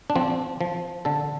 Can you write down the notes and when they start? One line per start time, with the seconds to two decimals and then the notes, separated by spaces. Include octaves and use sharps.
0.10 D4
0.16 F3 C4
0.61 F3
1.05 D3 A4